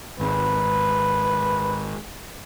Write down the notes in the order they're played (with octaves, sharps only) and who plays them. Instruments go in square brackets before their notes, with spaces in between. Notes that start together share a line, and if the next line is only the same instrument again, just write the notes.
[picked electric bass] G#1 [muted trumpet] B4